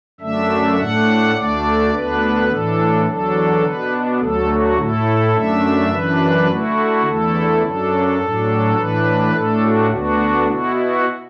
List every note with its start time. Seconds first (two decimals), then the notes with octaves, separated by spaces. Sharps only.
0.20 F#2 D3 A3 D4 E5
0.77 A2 A3 D4 F#5
1.34 D2 D3 A3 D4 D5
1.91 D2 D3 B3 D4 B4
2.48 A2 E3 D4 A4
3.05 E2 D3 F#3 D4 A4
3.63 B2 B3 D4 B4
4.20 D2 D3 F#3 A3 A4
4.48 F#4
4.76 A2 A3 E4 A4
5.34 F#2 D3 A3 D4 E5
5.91 F#2 E3 D4 B4
6.48 D3 A3 E4 F#4
7.05 E2 D3 A3 E4 A4
7.62 F#2 F#3 D4 A4
8.19 A2 F#3 D4
8.76 A2 E3 D4 B4
9.33 A2 A3 D4 A4
9.62 F#4
9.90 D2 D3 B3 D4 F#4
10.48 B2 B3 E4 F#4
10.76 F#4